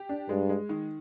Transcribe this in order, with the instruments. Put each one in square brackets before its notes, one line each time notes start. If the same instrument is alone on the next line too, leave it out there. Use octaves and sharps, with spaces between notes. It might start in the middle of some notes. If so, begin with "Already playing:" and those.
Already playing: [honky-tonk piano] G4
D4
[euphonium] G2 [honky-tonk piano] G#3
[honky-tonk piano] G#3
D#3